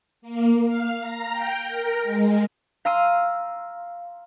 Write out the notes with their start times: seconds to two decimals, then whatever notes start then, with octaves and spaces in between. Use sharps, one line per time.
0.22 A#3
0.65 F5
1.00 A#5
1.32 G5
1.68 A#4
2.03 G#3
2.85 F5 A#5 C6 E6 C7 D#7